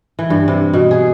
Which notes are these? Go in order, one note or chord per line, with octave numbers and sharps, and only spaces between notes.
E3
G2
C3
B2
G#4